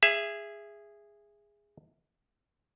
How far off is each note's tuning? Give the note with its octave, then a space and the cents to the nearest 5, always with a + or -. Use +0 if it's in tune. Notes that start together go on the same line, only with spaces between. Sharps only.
G#4 -10 E5 +15